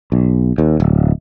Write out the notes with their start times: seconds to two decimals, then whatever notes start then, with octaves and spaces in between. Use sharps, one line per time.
0.12 B1
0.58 D#2
0.80 D1